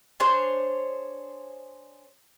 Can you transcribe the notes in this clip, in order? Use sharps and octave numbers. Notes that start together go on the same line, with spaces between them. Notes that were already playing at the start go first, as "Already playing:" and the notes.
D4 G#4 C5 C#5